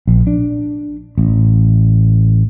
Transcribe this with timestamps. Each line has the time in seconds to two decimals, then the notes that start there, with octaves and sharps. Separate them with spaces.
0.07 A#1
0.27 D4
1.18 A1